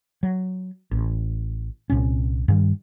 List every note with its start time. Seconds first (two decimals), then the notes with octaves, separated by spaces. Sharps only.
0.23 F#3
0.91 A1
1.90 C2 A#2 C4 C#4
2.48 G2 D#3 G3